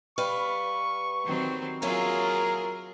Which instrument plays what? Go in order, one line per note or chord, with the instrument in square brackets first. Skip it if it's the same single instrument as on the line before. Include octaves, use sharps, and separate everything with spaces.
[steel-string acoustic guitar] G3 B4 F5 [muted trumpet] C#6
[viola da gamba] D#3 F#3 C4
[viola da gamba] F#3 F4 G#4 [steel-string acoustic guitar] A#3 C#4 E4 [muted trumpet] A#4